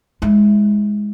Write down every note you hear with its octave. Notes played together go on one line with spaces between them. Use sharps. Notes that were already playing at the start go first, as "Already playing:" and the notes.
G#3 E4